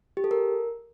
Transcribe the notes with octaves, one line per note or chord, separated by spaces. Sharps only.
G4
A4
A#4